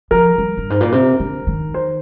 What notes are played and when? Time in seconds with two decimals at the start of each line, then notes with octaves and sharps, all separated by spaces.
0.11 F3 A#4
0.38 G3
0.57 G2
0.70 G#2
0.81 A#2
0.92 C3
1.19 D3
1.47 D#3
1.74 C5